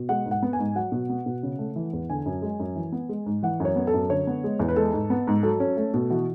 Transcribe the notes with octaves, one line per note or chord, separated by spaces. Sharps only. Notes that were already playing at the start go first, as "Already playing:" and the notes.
Already playing: B2
G#3 F#5
G#2
F#5
B3
G#5
G#2
F#3 F#5
B2
B3
B2
C#3
A3
E3
E2
D3 G#5
F#2
G#3
F#2
E3
B3
G#3
G#2
E3 F#5
F#2
C#5
B3
A4
F#2
D3 C#5
B3
G#3
E2
B4
G#3 A4
G#2
B3
G#2
F#3 A4
C#4
A3
B2
E3 F#4